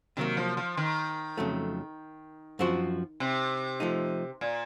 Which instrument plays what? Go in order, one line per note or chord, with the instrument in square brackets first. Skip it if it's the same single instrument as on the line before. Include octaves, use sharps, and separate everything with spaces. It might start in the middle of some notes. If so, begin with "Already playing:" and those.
[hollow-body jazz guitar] C3 F#3 A#3 [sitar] D#3
[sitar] F3
F3
D#3
[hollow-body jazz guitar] F2 C#3 F#3 A3
F#2 F3 C4 F#4
[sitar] C3
[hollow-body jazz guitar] F3 A3 D#4
[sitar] A#2